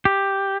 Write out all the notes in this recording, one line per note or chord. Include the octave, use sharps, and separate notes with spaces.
G4